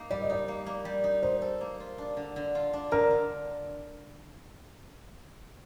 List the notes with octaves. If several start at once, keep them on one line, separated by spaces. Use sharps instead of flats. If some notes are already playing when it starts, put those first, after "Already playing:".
Already playing: A#3 D#4
G3 D5
D#5
D#4 D5
A#3
A#3
G3
D#4
D#4 C5
A4
A#3
F4
D4
D3
D3
F4
D4
D3 A#4
D3